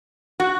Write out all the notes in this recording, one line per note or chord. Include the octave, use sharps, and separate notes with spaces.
F#4